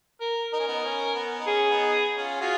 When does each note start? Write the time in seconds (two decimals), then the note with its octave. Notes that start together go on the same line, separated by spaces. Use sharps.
0.21 A#4
0.53 D#4 A#4
0.60 C#4
0.67 B3 D#4
0.84 C#4
1.15 B3
1.40 D#4
1.47 C#4 G#4
1.70 B3 D#4
2.17 C#4 F4
2.40 F4 F#4 G#4